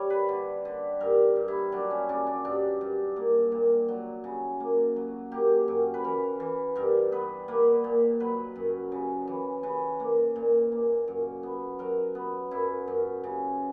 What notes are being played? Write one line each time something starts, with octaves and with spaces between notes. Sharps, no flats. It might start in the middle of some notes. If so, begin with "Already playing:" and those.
Already playing: G3 C#5
B4
D3
D3
G2 A#4
G2
E4
F#3 D4
C#4
C#3 D4
D4
G2 D4
G2
A#3
A#2
F#3
C#3
A#3
F#3
A#3 G4
F#2
B4
E3 A#4
E3
G2 A#4
B3 B4
A#3 B4
A#2
F#3 B4
F#2
C#3
E3
C#3 B4
A#3
A#2
A#3
F#2
B3
F#3 A#4
B3
F#2 E4
F#2
C#3